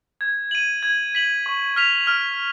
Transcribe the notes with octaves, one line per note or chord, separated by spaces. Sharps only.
G#6
D#7 F#7
G#6
B6 F#7
C#6
F6 B6 F7
F6